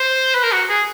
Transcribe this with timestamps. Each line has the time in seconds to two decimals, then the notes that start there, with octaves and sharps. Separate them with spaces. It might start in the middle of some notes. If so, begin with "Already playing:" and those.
Already playing: C5
0.35 B4
0.43 A#4
0.52 F#4
0.69 G#4